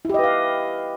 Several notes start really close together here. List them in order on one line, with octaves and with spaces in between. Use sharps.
E4 G4 D#5 B4 F5